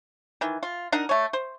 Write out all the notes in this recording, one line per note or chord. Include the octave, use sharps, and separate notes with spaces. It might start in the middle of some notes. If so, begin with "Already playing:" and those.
D#3 E3
F4
D4 D#4 A#4 F#5
A3 C#5
C5